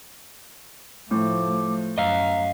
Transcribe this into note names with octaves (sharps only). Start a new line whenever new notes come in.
A2 F3 A3 D6
F#2 D#5 F5 A#5